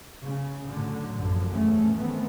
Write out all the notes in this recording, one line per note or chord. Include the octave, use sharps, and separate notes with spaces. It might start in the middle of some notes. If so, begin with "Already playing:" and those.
C#3
A2 D3 F#3
A1 F#2 D3 F3
E2 G#2 A3 C#4
D#3 A3 B3 C4